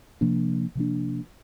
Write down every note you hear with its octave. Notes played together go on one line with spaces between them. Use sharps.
C3 F3 A#3 D4
C3 F3 A#3 D4